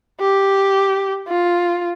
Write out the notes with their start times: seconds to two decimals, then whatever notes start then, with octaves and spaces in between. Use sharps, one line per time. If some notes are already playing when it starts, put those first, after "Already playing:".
0.20 G4
1.28 F4